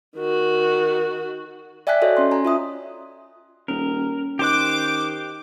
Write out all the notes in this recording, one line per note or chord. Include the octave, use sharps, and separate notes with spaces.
D#3 F#4
D5 E5 G5 G#5 F#6 B6
F#4 A4 C#5 D#5
C#4 C6
G#5 A#5
F4 E5 D#6
D#1 C#4 A#4
D#3 G4 C5 D6 F#6